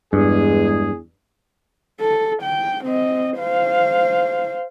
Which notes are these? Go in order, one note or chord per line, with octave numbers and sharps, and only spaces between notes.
E2 G2 G#3 G#4
A4
G5
C4 D#5
C5 F5